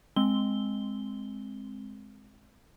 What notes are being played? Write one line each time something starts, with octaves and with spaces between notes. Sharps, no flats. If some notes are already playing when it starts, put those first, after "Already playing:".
G#3 C4 G7